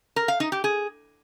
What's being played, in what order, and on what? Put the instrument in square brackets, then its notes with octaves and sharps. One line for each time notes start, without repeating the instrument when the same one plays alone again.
[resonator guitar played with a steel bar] A#4
F5
D#4
G4
G#4